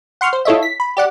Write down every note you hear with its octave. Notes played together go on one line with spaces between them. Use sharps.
F#5 C6 C#6 F6
C5
E4 F4 A4 C#5 D#5 E5
B6
B5
G4 D5 F#5